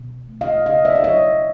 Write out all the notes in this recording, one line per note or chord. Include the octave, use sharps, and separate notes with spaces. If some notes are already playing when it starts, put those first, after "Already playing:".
Already playing: B2
A3
D#5 F5
C#3 D#5 F5
D5 E5
E5
F#3 C#5 D#5